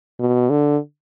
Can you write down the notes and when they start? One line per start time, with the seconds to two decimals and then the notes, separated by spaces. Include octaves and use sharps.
0.20 B2
0.50 D3